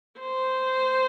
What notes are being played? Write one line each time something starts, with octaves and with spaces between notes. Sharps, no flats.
C5